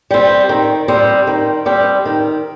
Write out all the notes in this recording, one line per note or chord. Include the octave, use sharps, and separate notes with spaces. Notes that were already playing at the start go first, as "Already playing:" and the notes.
G3 C4
D#3
G3 C4
D#3
G3 C4
D#3